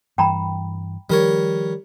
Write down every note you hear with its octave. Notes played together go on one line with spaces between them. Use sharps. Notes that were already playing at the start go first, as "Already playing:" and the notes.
G2 E3 G5 A#5 B5
D#3 F3 G3 A#4 C#5